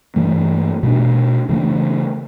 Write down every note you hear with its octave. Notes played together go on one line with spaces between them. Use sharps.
G2 E3 A3
B2 A3 D4
C#3 E3 A3 D4